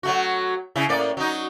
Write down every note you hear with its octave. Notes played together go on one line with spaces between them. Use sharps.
F#3 A3 F#4
C#3 E4
A2 A#3 D5
F#3 D#4